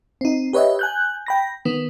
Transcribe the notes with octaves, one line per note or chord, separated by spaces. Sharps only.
C4 D#4
G4 B4 C#5 D#5 E5
G#5 F#6 G6
G5 B5 A#6
D#3 B3